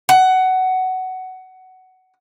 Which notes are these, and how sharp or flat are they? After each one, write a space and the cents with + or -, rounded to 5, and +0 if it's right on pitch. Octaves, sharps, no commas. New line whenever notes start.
F#5 +15